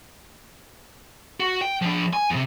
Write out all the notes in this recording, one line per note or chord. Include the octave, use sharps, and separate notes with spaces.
F#4
G5
F3 D4
G#5
E2 C3